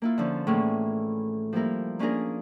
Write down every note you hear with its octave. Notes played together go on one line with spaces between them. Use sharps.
A#3 E4 F4
D3 F3 C#4
A2 E3 A#3 C#4 F4 G#4
F3 G3 A#3 E4 A#4
A#3 C#4 D4 F4 G#4 A#4